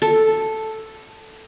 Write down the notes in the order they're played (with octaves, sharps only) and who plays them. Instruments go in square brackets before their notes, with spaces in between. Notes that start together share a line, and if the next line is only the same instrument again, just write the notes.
[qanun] A4